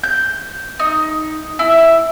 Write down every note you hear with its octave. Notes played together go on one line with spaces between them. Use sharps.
G6
D#4
E4